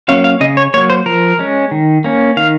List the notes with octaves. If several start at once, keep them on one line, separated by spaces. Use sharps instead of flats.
F#3 A#3 C#4 F5
F5
C#3 D#5
C#5
F#3 A#3 C#5
C5
F3 A#4
G#3 C#4
D#3
A#3 C#4
D#3 F5